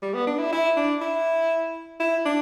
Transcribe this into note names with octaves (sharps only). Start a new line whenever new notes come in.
G3
B3
D4
E4
E4
D4
E4
E4
D4